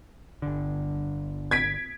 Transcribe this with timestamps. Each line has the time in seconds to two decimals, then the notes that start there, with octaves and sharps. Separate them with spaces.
0.42 G1 D3
1.51 G#6 B6 D7